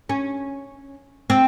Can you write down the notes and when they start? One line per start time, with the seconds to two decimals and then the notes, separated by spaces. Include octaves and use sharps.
0.09 C#4
1.30 C4